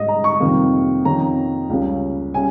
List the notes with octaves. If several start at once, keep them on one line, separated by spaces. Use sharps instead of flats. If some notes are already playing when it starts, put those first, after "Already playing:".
Already playing: G#2 G3 C#4 D#5
A#5
C#6
F2 C3 D#3 G3 A#3
F2 D#3 A#3 C#4 A#5
C#2 C#3 G3 A#3 C#4
C#3 G3 C#4 G#5